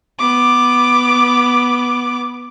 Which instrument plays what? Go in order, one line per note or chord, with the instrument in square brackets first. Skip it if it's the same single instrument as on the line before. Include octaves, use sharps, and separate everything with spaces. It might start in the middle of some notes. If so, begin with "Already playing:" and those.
[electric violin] B3 D6